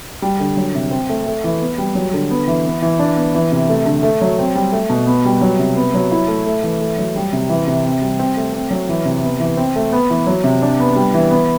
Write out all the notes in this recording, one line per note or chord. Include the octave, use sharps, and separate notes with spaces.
G3
D3
F#3
C3
C4
A3
A3
E3
B3
G3
F#3
D3
B3
E3
B3
E3
D4
B3
E3
C3
A3
D3
A3
F#3
C4
G3
A3
B2
B3
G3
F#3
C3
B3
F#3
E4
A3
A3
E3
A3
F#3
G3
C3
E3
C3
C4
G3
C4
A3
C4
F#3
E3
C3
B3
E3
C4
A3
B3
E3
F#3
C3
D4
B3
G3
E3
B3